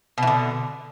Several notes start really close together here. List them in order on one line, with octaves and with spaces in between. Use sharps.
B2 E3 D3